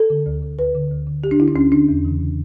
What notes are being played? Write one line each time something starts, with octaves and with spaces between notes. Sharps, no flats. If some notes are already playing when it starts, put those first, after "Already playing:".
Already playing: A4
D3
D2
D3
D2 B4
D3
D2
D3
D2 G4
D4
D3 E4
D4
D2 C#4
D3 D4
E2
C#3 E3